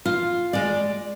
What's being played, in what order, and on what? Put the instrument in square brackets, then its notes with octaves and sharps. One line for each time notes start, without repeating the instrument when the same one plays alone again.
[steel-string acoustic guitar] F4
G#3 D5